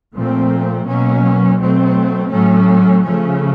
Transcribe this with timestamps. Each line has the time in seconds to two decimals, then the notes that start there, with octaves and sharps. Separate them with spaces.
0.14 A#2 F3 A3 C4
0.87 B2 F#3 A#3 C#4
1.60 B2 F#3 A3 C4
2.32 A2 F#3 A3 C#4
3.04 C#3 F3 A3 C#4